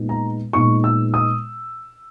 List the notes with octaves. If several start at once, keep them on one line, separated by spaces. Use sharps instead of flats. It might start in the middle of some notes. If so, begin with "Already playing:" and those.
Already playing: A#2 G#3 B3 D#4
A#5
A#2 G#3 B3 D#4 C#6
E6
D#6